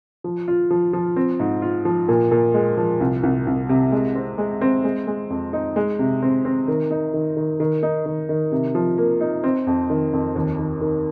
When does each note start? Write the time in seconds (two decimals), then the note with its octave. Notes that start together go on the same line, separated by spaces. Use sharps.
0.24 F3
0.48 F4
0.70 F3
0.93 F3
1.16 C4
1.40 G#2
1.62 F4
1.85 F3
2.09 A#2
2.31 A#2
2.54 G#3
2.77 F3
3.00 C2
3.23 C2
3.47 C2
3.69 C3
3.92 G#3
4.15 C4
4.38 G#3
4.61 C4
4.84 G#3
5.07 G#3
5.30 F2
5.53 D#4
5.76 G#3
5.99 C3
6.22 C4
6.45 C4
6.68 D#3
6.91 D#4
7.14 D#3
7.37 D#3
7.60 D#3
7.83 D#4
8.06 D#3
8.29 D#3
8.52 C3
8.75 F3
8.98 A#3
9.21 D#4
9.44 C4
9.67 F2
9.90 D#3
10.13 F2
10.36 D#2
10.59 D#3
10.81 D#3